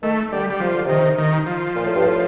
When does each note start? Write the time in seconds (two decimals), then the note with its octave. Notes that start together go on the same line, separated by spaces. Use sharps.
0.03 D#3 A3
0.32 D3 G3
0.50 G3
0.60 C3 F3
0.73 D3
0.85 C3 D#3
1.18 D#3
1.46 F3
1.76 A#2
1.85 A2
1.96 G2
2.05 A2